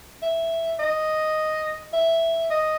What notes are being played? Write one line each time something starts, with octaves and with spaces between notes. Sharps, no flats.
E5
D#5
E5
D#5